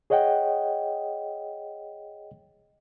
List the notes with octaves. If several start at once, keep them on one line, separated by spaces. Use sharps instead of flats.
G#4 C#5 D#5 F#5 G5